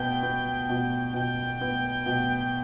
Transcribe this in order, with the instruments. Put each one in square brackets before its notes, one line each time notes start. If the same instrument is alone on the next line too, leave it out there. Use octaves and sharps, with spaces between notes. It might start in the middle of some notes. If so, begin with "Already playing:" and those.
Already playing: [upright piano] B2 B3 [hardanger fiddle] G5
[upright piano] B3
B2
[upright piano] B2 [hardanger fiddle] G5
[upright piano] B3
B2